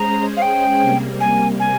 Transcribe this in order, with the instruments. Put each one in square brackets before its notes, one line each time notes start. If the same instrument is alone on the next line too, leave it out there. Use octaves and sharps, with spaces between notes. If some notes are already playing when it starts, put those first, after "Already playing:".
Already playing: [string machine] G#3 C#4 G#4 C5 [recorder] A#5
[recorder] F5
G5
[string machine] C3 G3 A#3
[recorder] G#5
G#5